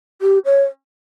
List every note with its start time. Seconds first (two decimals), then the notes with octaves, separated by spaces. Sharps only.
0.22 G4
0.45 C#5